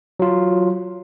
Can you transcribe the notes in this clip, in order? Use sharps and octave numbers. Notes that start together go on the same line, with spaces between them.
F#3 F4